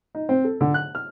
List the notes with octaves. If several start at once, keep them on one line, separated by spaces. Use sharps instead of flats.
D#4
C4
A4
D3
F#6
F6